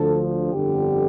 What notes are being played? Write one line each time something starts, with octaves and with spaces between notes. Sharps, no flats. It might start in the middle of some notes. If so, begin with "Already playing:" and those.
Already playing: D2 D3 F3 A4
G1 F2 D3 G4